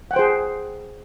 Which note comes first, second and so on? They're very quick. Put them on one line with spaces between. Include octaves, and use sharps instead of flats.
F#5 G5 C5 G#4